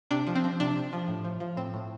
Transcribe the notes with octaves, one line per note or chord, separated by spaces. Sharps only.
C3 D4
F3
C4
F3
C3 D4
C3
F3
A2
F3
F3
A2 C4
A2